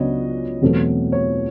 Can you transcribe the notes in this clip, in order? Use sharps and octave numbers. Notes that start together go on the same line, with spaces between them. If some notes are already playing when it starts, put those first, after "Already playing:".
Already playing: C#2 C#3 F#3 B3 D4 C#5 D#5
E2 B2 F#3 A3 C4
C#5